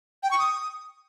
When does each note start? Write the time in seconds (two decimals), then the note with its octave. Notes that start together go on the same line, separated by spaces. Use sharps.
0.23 G5
0.31 C#6
0.39 D#6